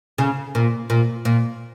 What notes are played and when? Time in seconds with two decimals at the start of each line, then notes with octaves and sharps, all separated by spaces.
0.18 C#3
0.55 A#2
0.90 A#2
1.25 A#2